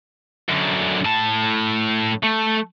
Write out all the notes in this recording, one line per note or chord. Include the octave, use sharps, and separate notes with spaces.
F#2 D3
A2 A5
A3